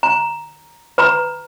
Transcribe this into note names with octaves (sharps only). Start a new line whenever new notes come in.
A#5
B4 A#5 B5